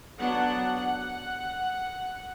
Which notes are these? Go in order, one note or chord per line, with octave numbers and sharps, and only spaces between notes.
F#3 B3 D4 F#5
F#5